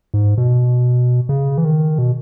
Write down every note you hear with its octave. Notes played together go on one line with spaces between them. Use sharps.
G#2
B2
C#3
E3
D#3
B2